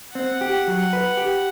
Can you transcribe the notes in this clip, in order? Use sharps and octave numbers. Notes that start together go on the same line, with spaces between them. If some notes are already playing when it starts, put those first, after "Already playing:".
C4 F#5
G4
F#3
B4
G4